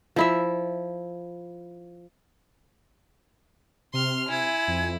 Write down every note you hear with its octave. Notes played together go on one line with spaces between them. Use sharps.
F3 E4 E5
C3 C6 F6
E4 G#5 C6 G#6
F2